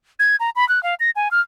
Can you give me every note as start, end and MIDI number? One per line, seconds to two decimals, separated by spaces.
0.19 0.36 92
0.40 0.50 82
0.56 0.67 83
0.69 0.82 90
0.83 0.94 77
1.00 1.10 94
1.16 1.28 80
1.31 1.41 89